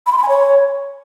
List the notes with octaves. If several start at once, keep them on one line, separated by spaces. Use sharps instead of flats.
B5
C6
B5
G#5
C#5